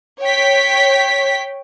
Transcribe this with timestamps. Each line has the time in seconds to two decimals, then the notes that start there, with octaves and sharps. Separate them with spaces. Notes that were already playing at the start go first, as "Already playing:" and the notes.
0.22 C#5 G5 B6